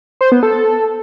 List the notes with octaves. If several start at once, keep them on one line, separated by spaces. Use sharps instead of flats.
C5
B3
A4